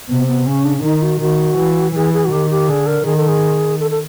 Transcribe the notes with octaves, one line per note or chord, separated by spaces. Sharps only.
C3 B3
B3
C#3 C#4
D4
D4
D#3 D#4
F#4
D#3 F#4
E3
E3 G#4
G#4
F#4
D#3 G4
G4
D3 G#4
A#4
D#3 G#4
A4
G#4
A4
A4